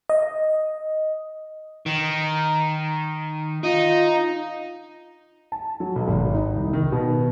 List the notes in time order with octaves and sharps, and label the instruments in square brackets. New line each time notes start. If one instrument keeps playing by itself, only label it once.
[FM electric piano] D#5
[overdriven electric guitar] D#3
[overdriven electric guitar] D#4 [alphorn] F4
[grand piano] A5
F#3
B1
G#1
D#4
C2
D#3
B2